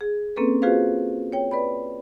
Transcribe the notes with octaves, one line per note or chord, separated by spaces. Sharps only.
G#4
A#3 C4 C#4 A4 B4
F4 F#4 G#4 B4 C5 F5
C#5 G5
B4 D5 B5